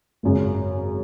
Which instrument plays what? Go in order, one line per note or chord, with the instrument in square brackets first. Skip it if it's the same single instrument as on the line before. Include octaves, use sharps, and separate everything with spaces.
[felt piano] G#1 F#2 C#3